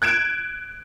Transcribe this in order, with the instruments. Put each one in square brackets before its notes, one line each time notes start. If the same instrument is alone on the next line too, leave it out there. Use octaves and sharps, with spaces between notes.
[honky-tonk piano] F#6 G#6 D7 E7